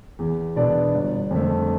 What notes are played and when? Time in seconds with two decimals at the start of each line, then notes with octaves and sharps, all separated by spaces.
0.19 E2
0.56 B2 B3 D4 D5
0.94 G1
1.31 F2 D3 A3